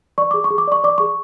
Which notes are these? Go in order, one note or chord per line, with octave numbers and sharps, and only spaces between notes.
D5 C#6
G#4 D6
C#6
G#4
D6
D5 C#6
D5 D6
G#4 C#6